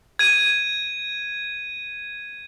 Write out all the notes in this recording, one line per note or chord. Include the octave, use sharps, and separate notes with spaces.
G#6 D#7